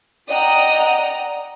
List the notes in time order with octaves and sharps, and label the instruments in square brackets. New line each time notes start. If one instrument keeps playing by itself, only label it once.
[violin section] D5 D#5 F#5 G5 A#5 D#6